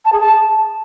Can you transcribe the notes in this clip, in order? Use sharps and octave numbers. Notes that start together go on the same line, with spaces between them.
A5
G#4
A5